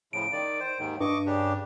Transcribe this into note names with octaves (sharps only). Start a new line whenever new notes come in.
A2 C#3 F3 D7
D#3 D5
C5
D#2 G#2 D#3
G2 D#5 C#6 D6
C#3 D4 G4